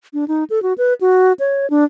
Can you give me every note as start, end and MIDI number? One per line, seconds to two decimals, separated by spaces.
0.14 0.25 62
0.28 0.44 63
0.50 0.62 69
0.63 0.73 66
0.78 0.94 71
1.01 1.33 66
1.40 1.69 73
1.70 1.84 62